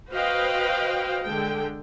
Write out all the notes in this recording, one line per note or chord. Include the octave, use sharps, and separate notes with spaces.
F#4 B4 C5 D#5 F5 G5
D3 G#3 A4 G5